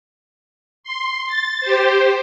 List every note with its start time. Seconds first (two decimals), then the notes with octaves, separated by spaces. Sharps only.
0.84 C6
1.27 A6
1.61 G4 C5